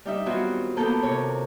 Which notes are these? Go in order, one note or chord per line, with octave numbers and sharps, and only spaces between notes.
G3 D#4 E5
D#3 F#3 B3 C4 F4 F#4
A#3 B3 A4 A5 A#5 G6
C3 C#5